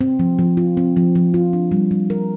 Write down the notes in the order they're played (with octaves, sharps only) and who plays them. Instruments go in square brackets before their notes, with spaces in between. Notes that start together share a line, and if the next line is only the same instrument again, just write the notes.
[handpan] C4
F3
F3
F4
C4
F3
F3
F4
D4
G3
G3
A#4